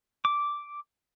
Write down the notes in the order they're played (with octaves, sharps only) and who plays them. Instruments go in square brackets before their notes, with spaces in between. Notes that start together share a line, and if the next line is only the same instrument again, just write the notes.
[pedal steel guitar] D6